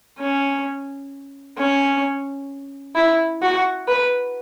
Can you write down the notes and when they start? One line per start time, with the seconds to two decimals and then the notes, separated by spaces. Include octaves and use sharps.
0.19 C#4
1.57 C#4
2.96 E4
3.42 F#4
3.88 B4